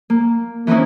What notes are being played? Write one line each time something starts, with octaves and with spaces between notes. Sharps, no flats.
A#3
E3 A#3 C4 C#4 D#4 E4